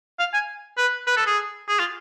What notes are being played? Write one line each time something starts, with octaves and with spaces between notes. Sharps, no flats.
F5
G#5
B4
B4
A4
G#4
G#4
F4